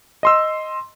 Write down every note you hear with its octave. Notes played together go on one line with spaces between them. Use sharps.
D#5 C6 E6